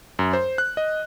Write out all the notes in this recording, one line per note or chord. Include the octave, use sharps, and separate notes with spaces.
F#2
C5
F#6
D#5